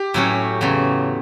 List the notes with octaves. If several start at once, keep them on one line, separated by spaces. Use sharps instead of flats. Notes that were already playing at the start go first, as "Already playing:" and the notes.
Already playing: G4
A2 F#3 C#4 F#4
E2 C#3 F#3